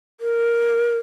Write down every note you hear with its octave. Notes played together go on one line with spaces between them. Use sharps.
A#4